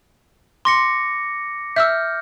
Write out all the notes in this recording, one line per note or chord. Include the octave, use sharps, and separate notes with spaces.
C6 D6 A#6 C#7
E5 E6 F6 G6